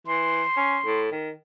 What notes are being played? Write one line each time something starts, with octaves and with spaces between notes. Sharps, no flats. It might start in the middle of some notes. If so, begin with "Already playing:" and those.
E3 C6
C#4
A2
D#3